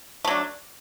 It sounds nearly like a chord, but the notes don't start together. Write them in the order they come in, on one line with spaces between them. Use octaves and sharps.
A3 F#3 D4